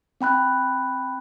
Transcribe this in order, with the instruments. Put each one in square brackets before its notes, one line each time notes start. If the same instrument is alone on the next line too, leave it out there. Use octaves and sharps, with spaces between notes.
[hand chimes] C4 G5 B5 F#6